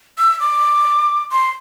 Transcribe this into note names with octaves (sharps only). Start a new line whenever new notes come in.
E6
D6
C6